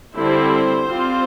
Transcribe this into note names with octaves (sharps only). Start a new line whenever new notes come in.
D3 G3 C4 E4 C5
G3 C4 F4